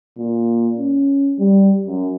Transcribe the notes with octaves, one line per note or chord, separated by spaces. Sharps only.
A#2
C#4
G3
F#2